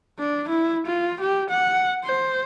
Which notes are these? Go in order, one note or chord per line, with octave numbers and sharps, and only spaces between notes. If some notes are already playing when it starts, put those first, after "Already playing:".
D4
E4
F4
G4
F#5
C5